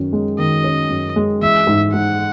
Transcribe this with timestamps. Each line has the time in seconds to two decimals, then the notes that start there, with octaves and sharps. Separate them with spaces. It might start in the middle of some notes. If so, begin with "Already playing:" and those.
Already playing: F#2 D#3 C#4
0.13 G#3
0.38 D#3 D#5
0.64 C#4
0.90 F#2
1.16 G#3
1.42 E3 E5
1.67 G#2
1.93 G#2 F#5